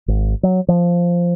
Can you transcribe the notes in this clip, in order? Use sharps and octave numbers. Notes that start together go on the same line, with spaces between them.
G#1
F#3
F3